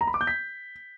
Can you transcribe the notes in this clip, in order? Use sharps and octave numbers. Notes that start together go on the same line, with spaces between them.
A#5
B5
D6
G6
B6